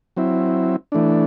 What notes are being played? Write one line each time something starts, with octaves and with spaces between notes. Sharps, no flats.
F#3 C4 E4
E3 A3 D4